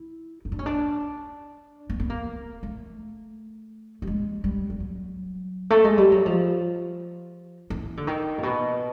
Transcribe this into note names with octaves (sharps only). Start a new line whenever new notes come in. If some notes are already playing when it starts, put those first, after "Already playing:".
Already playing: E4
D#4
D4
C#4
D4
A#3
B3
A#3
A3
G3
G#3
G3
G3
F#3
A3
G#3
G3
F#3
F3
E3
D3
D#3
A#2
B2